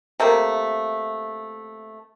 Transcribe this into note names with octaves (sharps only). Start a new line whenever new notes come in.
C3 A3 A#3